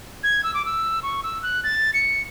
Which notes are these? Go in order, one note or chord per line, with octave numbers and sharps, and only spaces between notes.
G#6
E6
D6
E6
C#6
E6
F#6
A6
C#7